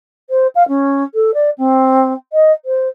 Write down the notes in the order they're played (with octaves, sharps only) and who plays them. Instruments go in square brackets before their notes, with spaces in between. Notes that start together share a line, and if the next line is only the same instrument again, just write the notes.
[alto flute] C5
F5
C#4
A4
D5
C4
D#5
C5